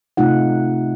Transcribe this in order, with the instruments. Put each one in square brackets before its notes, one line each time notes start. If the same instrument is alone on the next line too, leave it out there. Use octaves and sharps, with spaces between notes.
[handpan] C3 A3 D#4 F4 F#5